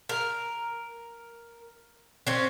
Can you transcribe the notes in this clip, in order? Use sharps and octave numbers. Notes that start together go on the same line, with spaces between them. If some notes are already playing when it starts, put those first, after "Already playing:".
A#4
C4 C#4